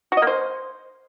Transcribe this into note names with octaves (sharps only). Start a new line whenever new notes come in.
F#4
D#5
A#3
C5